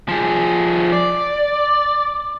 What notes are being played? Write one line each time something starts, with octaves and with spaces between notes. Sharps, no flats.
F3 G#4
D5